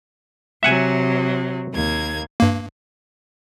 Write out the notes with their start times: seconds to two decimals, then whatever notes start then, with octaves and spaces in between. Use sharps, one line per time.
0.63 C3 F#3 E5 F#5 G#5
1.71 D#2 A#3 G#6
2.40 G2 A#3